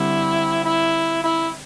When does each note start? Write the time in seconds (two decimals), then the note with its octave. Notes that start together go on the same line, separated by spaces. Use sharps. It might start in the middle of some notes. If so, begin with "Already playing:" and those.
Already playing: D3 G3 C4 E4 G4
0.65 E4
1.24 E4